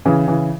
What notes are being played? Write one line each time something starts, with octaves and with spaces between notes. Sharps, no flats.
C#3 E3
C#3 E3